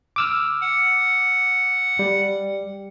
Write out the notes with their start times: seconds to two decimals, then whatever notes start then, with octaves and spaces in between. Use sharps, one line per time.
0.16 D6 E6 F6
0.61 F#5
1.99 G3